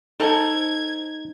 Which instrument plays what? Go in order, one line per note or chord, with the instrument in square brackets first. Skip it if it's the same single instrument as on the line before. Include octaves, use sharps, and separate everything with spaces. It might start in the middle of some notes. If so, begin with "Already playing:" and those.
[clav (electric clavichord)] D#4 [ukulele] A4 C5 A5 [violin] G#6